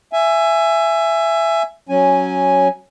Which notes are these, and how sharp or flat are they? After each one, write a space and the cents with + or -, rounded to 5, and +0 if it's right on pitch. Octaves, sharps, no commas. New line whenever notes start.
E5 +20 G#5 +0
F#3 +0 C#4 +0 G#5 -5